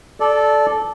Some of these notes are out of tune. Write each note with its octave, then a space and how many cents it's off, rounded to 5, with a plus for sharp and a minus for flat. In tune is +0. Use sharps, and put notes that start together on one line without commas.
A4 -15 D5 +0